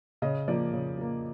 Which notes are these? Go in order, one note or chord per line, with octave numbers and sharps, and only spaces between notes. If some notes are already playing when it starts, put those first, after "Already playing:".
C#3 D#5
F3 A#3 D5
C#3
F3 A#3